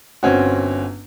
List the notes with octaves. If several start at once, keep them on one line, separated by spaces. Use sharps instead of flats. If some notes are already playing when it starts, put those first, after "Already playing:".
G1 C4 C#4 F#4